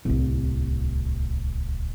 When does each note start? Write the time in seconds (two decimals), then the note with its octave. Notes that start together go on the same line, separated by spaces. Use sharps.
0.05 D1 C2